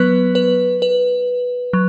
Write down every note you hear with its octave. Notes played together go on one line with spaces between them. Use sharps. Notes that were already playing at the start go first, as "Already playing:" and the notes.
Already playing: F#3 B3 B4
B4
B4
F#3